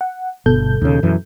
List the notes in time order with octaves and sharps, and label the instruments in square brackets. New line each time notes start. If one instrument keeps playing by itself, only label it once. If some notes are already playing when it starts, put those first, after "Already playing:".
[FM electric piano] F#5
[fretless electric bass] G1 [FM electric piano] B2 A4 G6
[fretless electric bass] D#2 C#3
F#2 E3